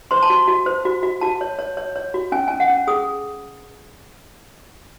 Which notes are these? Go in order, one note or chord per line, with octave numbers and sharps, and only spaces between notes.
C5 C6
A5
F#4 C6
F#4
C5
F#4
F#4
F#4 A5
C#5
C#5
C#5
C#5
F#4
C#4 G#5
C#4 G#5
F#5
C#4
G#4 D#6